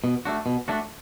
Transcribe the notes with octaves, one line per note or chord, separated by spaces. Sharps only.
B2
A3 D4 F#4
B2
A3 D4 F#4